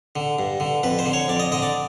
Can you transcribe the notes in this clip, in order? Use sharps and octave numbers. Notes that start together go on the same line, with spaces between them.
D3
G2
D3
F2 B4
C5
D3
C#5
F2 D5
D#5
D3 D#5
D5